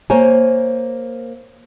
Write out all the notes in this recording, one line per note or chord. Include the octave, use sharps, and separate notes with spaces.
A#3 C5 C#5 G#5